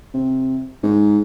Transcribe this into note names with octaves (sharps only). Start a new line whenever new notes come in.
C3
G#2